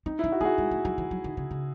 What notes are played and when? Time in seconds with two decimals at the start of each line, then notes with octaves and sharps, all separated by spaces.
0.06 C4 D#4
0.19 E4
0.24 C#4
0.32 F#4
0.41 A3 G#4
0.45 F#4
0.58 G#3
0.71 A3
0.85 F#3
0.98 E3
1.11 F#3
1.24 D#3
1.37 C#3
1.51 C#3